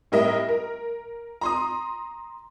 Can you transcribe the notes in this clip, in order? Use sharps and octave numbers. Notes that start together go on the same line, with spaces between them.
A2 G3 A#4 D#5 E5
A#4
A#5 C6 D#6